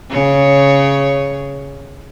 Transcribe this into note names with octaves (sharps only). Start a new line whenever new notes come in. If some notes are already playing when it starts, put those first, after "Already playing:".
C#3 C#5